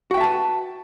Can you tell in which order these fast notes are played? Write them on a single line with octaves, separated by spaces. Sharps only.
F#4 G5 E5 A5 B4